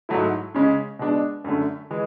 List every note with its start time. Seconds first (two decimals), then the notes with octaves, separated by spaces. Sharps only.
0.09 G#2 F#3 A3 E4
0.55 C#3 G#3 C#4
0.99 B2 G#3 D4
1.44 F#2 D3 A3
1.91 E3 G#3